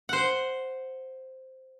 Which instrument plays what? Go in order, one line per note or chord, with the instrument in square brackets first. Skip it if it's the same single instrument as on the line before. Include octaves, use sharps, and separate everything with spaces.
[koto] C5 F#5